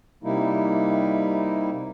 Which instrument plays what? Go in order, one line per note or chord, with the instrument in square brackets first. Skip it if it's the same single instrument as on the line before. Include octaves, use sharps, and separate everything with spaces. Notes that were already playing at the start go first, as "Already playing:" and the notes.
[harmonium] C3 G3 A#3 D#4 E4